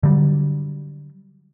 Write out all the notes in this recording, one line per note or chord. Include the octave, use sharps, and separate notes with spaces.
D3 F#3 G3